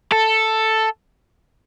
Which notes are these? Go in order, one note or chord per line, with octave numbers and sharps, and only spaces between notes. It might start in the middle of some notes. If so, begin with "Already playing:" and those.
A4